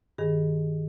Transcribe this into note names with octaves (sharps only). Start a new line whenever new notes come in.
G2 D#3 G#4